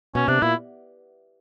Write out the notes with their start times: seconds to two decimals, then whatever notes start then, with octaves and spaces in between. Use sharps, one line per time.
0.15 B2 C#4
0.28 C3 D4
0.42 A#2 E4